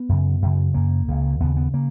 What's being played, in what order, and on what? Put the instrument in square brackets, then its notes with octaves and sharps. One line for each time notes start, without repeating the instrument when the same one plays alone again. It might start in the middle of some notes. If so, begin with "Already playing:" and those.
Already playing: [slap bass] B3
F#2 C#3
F#2 C#3
F#2 C#3 A#3
C#2 C#3
D#2 C#3 B3
B3
C#3 A#3